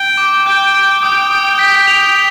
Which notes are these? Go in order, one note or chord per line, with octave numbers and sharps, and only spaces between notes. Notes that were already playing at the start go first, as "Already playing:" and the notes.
Already playing: G5
D6
G5 G6
D7
G5 D#6
D#6
B6
F7